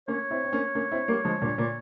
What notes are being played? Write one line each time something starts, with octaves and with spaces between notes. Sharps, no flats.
A#3 C#4 C#5
C4 E4
C4
A#3 C#4
A#3 C#4
C4 E4
G3 A#3
F3 G#3
G2 A#2
A#2